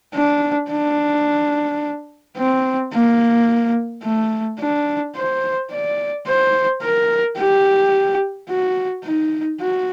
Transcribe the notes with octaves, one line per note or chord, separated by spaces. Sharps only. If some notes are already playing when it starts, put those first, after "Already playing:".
D4
D4
C4
A#3
A3
D4
C5
D5
C5
A#4
G4
F#4
D#4
F#4